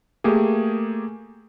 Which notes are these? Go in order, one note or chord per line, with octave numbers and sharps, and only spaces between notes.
A3 A#3 G4 G#4